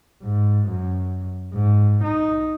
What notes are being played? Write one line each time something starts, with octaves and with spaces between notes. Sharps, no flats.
G#2
F#2
G#2
D#4